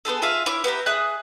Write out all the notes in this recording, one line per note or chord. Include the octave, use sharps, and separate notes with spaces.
B3 F#4 G#4 A4
F4 G#4 E5 F5
E4 C#5 D6
B3 E4 G4 A#5
G#4 E5 D#6 F#6